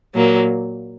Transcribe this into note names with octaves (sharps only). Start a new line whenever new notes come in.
A#2 F#3 A#3